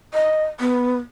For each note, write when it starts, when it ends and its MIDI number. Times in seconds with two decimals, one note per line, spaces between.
0.14 0.43 75
0.60 0.95 59